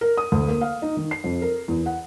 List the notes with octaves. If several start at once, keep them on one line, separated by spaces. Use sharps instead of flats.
A#4
D#6
D2
A#3
F5
D#4
D#3
C7
F2
A#4
E2
F#5